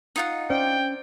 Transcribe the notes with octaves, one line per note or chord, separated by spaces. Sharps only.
D#4 F4 F#5
C#4 C5 D5 G5